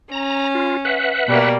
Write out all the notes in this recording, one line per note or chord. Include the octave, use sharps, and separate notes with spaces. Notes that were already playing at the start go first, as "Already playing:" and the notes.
C#4 A#5
F4
B4 E5 F#5
B2 G3 A#3